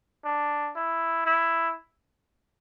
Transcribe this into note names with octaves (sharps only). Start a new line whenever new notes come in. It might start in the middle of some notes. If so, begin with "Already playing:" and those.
D4
E4
E4